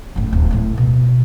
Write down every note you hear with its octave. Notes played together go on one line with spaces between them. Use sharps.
F#1 A2
D1
A2 A3
B2